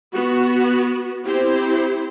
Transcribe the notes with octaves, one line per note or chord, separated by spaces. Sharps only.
B3 F#4
C4 E4 G4 C5